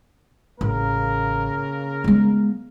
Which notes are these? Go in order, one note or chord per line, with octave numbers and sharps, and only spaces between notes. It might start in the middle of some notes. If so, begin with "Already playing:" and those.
A1 C#3 A#3 A#4
G#3 B3